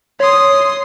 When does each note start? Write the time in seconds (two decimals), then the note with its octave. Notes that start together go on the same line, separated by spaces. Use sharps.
0.20 C#5 C6 D#6